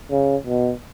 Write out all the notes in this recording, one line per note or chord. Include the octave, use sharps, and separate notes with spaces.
C#3
B2